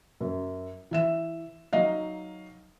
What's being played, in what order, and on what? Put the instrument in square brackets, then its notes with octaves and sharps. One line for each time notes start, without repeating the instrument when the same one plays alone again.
[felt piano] F#2
E3 E5 E7
F#3 D#4 D#5 F5